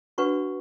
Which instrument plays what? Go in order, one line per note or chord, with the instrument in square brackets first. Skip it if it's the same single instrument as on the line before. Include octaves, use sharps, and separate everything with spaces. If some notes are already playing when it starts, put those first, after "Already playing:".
[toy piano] D4 F#4 B4 F#5 C#6